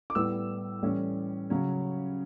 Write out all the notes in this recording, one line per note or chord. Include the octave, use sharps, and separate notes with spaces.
D6
A2 G3 B3 E6
A2 E3 G3 C#4
C#3 F#3 C#4